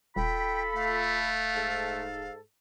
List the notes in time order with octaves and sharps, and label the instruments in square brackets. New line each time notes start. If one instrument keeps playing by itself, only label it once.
[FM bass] D#1 [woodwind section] F4 A4 B5 [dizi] G5
[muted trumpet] A3 [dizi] F5
[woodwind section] G#2 A4